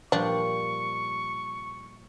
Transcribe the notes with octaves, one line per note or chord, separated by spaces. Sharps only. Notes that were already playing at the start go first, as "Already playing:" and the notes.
A#2 F3 G3 D4 C#6